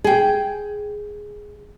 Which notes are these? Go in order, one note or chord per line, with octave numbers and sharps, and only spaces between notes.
G#4 G5